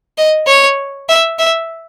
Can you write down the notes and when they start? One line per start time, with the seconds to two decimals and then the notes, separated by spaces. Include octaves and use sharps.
0.18 D#5
0.47 C#5
1.09 E5
1.39 E5